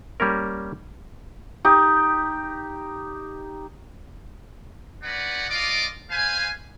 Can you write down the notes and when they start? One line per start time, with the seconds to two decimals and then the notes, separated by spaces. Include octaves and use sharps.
0.20 G3 A#3 C#4 A#4
1.65 D#4 G4
5.03 C#4 D#4 B4 D5 F#5
5.50 F4 D5 D#5 F5 D6
6.11 B4 C5 F5 G#5